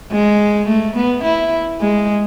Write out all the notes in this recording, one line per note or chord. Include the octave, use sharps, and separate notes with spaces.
G#3
A3
B3
E4
G#3